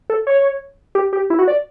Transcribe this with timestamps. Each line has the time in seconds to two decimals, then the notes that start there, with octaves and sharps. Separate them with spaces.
0.10 A4
0.27 C#5
0.95 G4
1.13 G4
1.30 E4
1.39 F#4
1.48 D5